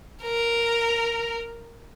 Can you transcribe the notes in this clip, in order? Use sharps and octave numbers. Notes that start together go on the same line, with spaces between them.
A#4